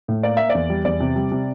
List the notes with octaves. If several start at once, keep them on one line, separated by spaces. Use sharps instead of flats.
A2
A#3 D5
A#3 E5
D5
E2
G3
E2 D5
C3
G3
C3